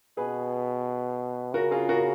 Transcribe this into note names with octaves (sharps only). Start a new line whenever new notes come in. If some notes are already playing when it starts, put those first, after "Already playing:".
B2 G#4 B4
C#3 F#4 A#4
F4 G#4
F#4 A#4